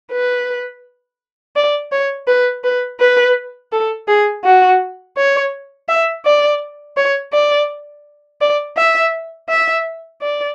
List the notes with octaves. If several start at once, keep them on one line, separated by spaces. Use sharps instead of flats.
B4
D5
C#5
B4
B4
B4
A4
G#4
F#4
C#5
E5
D5
C#5
D5
D5
E5
E5
D5